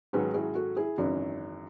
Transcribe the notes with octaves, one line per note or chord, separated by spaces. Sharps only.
G#2 D#3 F#3 C#4 G#4 B4
E4 G#4
F#4 A4
E4 G#4
G#1 F#2 C#3 E3 D#4 F#4